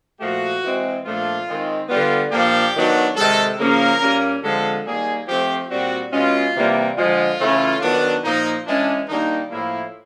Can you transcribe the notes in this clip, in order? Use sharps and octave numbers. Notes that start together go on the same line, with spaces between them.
A#2 F3 A3 F#4
E3 G#3 C4
A#2 F3 A3 D4 F4
D#3 G#3 C4
D3 G3 B3 F4
A#2 F3 A#3 D4 G4
D#3 F#3 B3 D4
C3 D#3 G#3 A4
C#3 F3 A#3 C#4 A#4
A#2 G3 A#3 C#4
D3 F3 G#3 C4 A4
D#3 G3 A#3 G#4
F3 A3 C4 G4
A#2 G3 C4 F#4
B2 G#3 C#4 F4
C3 E3 G3 A#3
D3 F3 G#3 F4
C#3 E3 A3 C#4
D#3 F#3 B3 D4
A#2 F3 A#3 D#4
E3 G#3 C#4 D4
D#3 G3 A#3 D4 D#4
A2 F3 A#3 E4